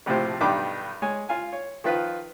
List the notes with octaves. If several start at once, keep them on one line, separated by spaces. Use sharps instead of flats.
A#1 A2 C3 F3 G4 C5
B1 G2 D#3 D4 G4 D6
G#3 C#5 G#5
F4 F5 G#5
C#5
D#3 F3 F4 B4